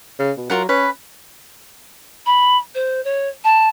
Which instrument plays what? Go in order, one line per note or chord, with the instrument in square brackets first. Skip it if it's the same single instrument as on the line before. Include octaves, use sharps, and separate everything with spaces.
[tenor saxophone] C#3
B2
[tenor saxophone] F#3 [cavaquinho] F4 A#4 F#5
[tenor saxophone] C#4 [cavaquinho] B4
[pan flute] B5
C5
C#5
A5